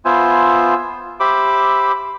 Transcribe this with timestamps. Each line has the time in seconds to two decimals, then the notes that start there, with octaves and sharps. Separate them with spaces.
0.05 B3 F4 C5 E5 G#5
1.20 G4 C5 E5 B5 D6